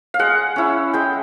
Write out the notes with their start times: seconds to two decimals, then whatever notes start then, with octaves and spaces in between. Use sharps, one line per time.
0.14 F5
0.19 G#3 F#5
0.56 C#4 E4
0.93 G#3 G5